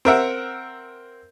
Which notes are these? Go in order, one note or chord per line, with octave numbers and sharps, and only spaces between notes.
C4 A#4 E5 F#5